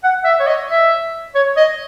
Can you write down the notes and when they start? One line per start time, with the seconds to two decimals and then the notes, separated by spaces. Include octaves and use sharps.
0.03 F#5
0.24 E5
0.40 C#5
0.46 D#5
0.69 E5
1.35 C#5
1.57 D#5